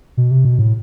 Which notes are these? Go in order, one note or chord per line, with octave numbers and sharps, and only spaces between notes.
B2
C3
B2
A2